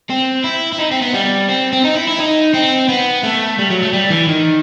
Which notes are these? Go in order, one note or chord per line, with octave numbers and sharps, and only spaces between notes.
C4
E4
E4
D#4
C4
B3
G3
C4
C4
D#4
E4
E4
D#4
C4
B3
A3
G3
F#3
A3
G3
E3
D#3